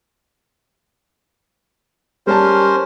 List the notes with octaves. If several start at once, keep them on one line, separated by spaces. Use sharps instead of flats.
G3 C#4 A#4 C5 A5